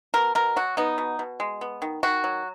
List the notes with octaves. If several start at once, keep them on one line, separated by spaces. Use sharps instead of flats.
B2 A#4
B2 A#4
F#3 F#4
B3 D#4
B2
B2
G#3
B3
D#3
D#3 F#4
F#3